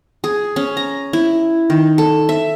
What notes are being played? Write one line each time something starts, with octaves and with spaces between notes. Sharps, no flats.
G#4
C#4
A#5
E4
D#3
A4
E5